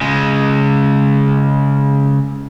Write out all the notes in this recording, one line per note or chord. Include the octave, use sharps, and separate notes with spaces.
C#3 G#3